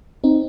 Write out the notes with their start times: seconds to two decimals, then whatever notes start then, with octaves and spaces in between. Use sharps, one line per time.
0.24 C4 D#4